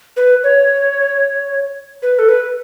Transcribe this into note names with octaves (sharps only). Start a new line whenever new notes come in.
B4
C#5
B4
A4
B4